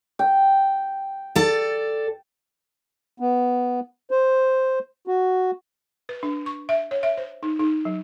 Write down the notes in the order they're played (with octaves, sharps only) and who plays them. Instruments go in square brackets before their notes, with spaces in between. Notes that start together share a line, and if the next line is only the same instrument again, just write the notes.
[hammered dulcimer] G5
[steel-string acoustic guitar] A4 D5
[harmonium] B3
C5
F#4
[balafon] B4
D4
C#6
E5
C#5
E5
C5
D#4
D#4
F#3